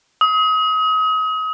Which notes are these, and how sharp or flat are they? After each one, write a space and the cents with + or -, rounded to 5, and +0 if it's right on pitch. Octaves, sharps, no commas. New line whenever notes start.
D#6 +35